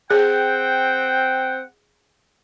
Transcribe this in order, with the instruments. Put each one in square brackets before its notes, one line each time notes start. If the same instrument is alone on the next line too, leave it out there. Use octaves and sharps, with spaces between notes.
[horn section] C4 F#5 G5 [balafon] G#4